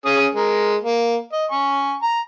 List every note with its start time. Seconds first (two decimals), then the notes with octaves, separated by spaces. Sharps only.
0.06 C#4 G#4 D#6
0.35 G#3 A#4
0.81 A#3
1.33 D#5
1.51 G#5 C#6
2.03 A#5